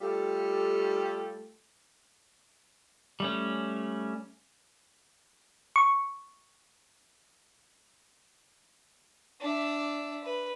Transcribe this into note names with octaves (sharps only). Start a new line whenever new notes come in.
G3 A3 F4 G4 A4
G3 A3 C#4
C#6
D4 E5
B4